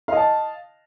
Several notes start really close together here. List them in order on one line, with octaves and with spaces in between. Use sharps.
F5 D#5 A5